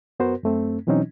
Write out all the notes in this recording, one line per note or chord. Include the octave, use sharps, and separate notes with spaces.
F#2 B3 F#4 A#4 C5
F#2 A3 C4
B2 E3 F#3 C4 C#4 D#4